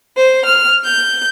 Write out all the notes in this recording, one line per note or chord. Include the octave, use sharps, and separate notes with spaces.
C5
F6
G6